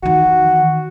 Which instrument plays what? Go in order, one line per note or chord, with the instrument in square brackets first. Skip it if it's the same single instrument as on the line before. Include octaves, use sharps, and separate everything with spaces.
[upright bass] D#3 E3 [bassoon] F#4